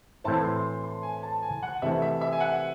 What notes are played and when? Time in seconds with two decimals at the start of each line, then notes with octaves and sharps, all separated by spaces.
0.24 A2 E3 C4 E4 C5 A5
0.44 C6
0.84 C6
1.03 G#5
1.23 A5
1.43 G#5
1.63 F#5
1.82 C3 E3 A3 E5
2.02 E5
2.21 E5
2.32 G#5
2.40 F#5